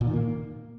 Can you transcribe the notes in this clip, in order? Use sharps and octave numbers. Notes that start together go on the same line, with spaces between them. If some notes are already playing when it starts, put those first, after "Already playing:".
A#2
D#3
A#3